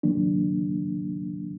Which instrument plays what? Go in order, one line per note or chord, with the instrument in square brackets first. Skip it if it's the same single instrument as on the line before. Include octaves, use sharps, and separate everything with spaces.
[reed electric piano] D#3 F#3 A#3 D4